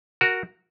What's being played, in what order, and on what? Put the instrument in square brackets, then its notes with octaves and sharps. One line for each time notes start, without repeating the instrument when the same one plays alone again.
[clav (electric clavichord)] F#4 A#4